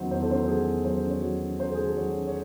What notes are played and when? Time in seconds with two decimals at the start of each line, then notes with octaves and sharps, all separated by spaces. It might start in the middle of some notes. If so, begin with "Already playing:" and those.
Already playing: E2 D#3 F#3 C#4 C5
0.11 E2 C5
0.21 A4
0.29 C#4 C5
0.48 F#3 G#4
0.67 E2
0.85 F#3 C5
1.04 C#4
1.10 C#5
1.22 F#3
1.41 C#4
1.60 C#4 C5
1.68 A4
1.75 G#4
1.78 D#3
1.84 A4
1.97 F#3 C#5
2.16 C#4
2.27 C#5